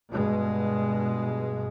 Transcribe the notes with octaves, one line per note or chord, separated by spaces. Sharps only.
G2 B2 G#3